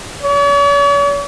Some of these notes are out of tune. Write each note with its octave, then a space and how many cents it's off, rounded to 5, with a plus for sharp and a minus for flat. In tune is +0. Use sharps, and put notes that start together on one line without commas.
C#5 +45